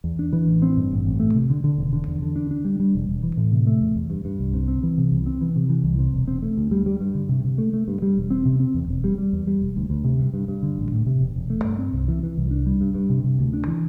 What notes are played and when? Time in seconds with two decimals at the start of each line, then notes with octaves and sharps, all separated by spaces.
0.04 E2
0.19 D4
0.33 E3
0.47 A1
0.62 C4
0.77 G2
0.91 A1
1.05 A1
1.20 A3
1.34 C3
1.50 D3
1.64 D3
1.78 E1
1.93 D3
2.08 E2
2.22 D3
2.36 D4
2.51 D4
2.65 G3
2.80 G3
2.95 E1
3.09 E1
3.23 E3
3.37 A2
3.52 C3
3.67 A3
3.81 E2
3.96 E2
4.10 G2
4.25 G2
4.39 C2
4.54 C3
4.68 C4
4.83 E3
4.98 C3
5.12 C2
5.26 C4
5.41 E3
5.56 C3
5.70 E3
5.84 C2
5.99 C3
6.14 E1
6.27 C4
6.42 A3
6.57 D2
6.71 G3
6.86 G3
7.01 G2
7.15 D3
7.29 C3
7.44 C3
7.58 A3
7.73 A3
7.88 G2
8.02 G3
8.17 E1
8.30 C4
8.45 C3
8.60 C4
8.74 E2
8.88 E1
9.04 G3
9.18 G3
9.33 E2
9.47 G3
9.61 E1
9.77 D2
9.90 D2
10.04 C3
10.20 G2
10.34 G2
10.48 G2
10.63 D3
10.78 A1
10.92 A2
11.06 C3
11.21 E1
11.36 E1
11.50 A3
11.64 G2
11.78 C4
11.93 C2
12.08 E3
12.23 E3
12.37 C2
12.51 D4
12.66 G3
12.81 G2
12.94 G2
13.10 C3
13.24 C3
13.39 D2
13.53 D4
13.67 E3